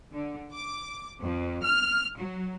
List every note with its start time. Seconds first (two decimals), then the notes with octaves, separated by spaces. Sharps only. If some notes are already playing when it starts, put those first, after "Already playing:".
0.12 D3
0.53 D6
1.21 F2
1.63 F6
2.18 F#3